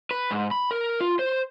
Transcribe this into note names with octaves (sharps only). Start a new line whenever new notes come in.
B4
G#2
B5
A#4
F4
C5